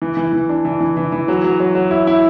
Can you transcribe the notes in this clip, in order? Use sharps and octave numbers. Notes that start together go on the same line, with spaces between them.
E3
E3
E3
D4
E3
E3
E3
E3
F#3
F#3
F#3
F#3
E4
E4